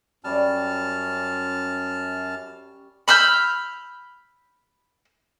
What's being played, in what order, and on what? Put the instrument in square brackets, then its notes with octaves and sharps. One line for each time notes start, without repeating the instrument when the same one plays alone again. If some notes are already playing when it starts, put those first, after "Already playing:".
[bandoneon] F#2 A5 F6 [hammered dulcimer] G3 C#4
[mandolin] B5 E6 F6 G6